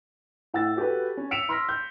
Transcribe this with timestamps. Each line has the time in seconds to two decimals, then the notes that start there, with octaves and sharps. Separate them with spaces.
0.54 A2 F#5 E6 A6
0.77 F#4 G4 A4 B4
1.17 C#4
1.31 E6 B6 C#7 D7 E7 F7
1.49 B5 C6 E6 F6 A#6 B6
1.69 G6